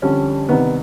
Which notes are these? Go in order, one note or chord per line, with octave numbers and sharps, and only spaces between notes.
F2 D3 G3 C#4
C2 C3 D#3 B3